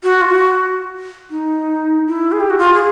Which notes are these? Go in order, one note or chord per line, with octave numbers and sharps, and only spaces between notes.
F#4
F4
F#4
D#4
E4
G#4
G4
F#4
F4
G#4